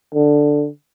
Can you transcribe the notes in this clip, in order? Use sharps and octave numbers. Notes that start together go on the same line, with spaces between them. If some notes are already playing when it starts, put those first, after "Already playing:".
D3